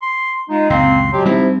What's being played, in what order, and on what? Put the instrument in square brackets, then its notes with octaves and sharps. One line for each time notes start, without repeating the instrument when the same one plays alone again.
[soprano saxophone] C6
[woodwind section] G#3 D#4 [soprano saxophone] F4
[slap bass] C#2 F#2 A#2 [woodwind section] A#3 C4 [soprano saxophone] C6
[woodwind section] B2 F#3 [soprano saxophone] G4
[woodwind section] G#2 C3 F3 [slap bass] G3 C4 [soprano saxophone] E4